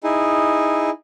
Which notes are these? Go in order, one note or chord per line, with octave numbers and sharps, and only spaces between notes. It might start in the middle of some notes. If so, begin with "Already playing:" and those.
D#4 E4 G#4